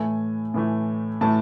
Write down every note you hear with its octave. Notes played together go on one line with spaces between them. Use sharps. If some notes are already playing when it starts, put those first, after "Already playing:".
Already playing: A2 E3 A3 G#5
A2 E3 A3
A2 E3 A3 A5